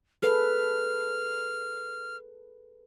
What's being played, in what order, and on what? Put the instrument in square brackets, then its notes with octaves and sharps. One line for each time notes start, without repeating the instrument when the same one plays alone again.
[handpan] G#4 A4 B4 [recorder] F6